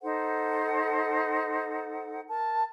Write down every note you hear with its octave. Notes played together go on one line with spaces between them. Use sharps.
D#4 A4 C5 F#5
A#4 A5